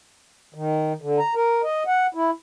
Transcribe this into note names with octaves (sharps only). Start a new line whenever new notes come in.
D#3
D3
A#5
A#4
D#5
F#5
E4